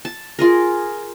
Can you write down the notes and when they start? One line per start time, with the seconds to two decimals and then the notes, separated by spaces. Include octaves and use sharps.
0.05 A5
0.39 F4 G#4 A#4